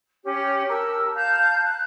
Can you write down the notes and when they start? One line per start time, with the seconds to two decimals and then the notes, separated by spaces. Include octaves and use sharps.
0.23 C#4 G4
0.69 G4 A#4 A5 E6
1.14 F5 A5 A#5 G6
1.62 F#6